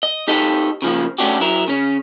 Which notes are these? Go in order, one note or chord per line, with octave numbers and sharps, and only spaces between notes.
D#5
D#4 G4 A4 D#5
C#3 F3 A#3
A3 C#4 D4 F#4 G4
F#3 E4 A#4
C#3 C#4